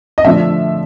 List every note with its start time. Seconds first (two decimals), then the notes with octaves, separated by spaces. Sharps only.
0.18 D#5
0.25 D3 F3 A3 D4 E5